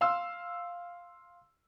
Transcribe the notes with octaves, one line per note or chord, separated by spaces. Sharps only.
F5 C6 E6